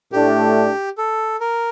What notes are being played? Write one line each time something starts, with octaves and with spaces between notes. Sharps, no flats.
A2 A3 D4 G4
A4
A#4